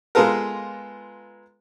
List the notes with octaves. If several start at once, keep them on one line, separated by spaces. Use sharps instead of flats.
G#3 B3 F4 A4 A#4